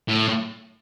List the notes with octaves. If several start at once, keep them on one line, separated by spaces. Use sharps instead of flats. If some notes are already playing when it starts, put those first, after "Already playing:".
A2